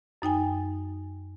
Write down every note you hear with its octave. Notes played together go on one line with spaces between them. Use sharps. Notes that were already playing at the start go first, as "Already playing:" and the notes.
F#2 D#4 G5 G#5